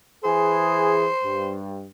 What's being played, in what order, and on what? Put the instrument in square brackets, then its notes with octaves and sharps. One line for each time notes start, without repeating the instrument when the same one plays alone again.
[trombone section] E3 G#4 [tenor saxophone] C5
[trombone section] G2